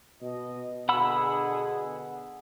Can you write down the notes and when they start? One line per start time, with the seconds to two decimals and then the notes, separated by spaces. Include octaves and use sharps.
0.22 B2 D#5
0.89 B2 D3 G#4 F#5 B5 E6